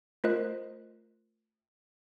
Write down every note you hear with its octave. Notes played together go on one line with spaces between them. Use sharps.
A3 F4 A#4 C5 D#5 F#6